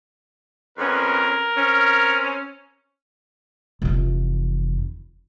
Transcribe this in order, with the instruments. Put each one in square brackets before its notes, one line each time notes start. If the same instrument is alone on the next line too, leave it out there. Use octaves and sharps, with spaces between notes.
[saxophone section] F2 B3 C#4 [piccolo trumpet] A#4
[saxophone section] C4 C#4
[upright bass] F1 E3